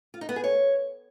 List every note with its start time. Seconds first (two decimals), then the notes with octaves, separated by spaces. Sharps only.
0.14 F4
0.21 D#4
0.29 B3
0.36 G#4
0.44 C#5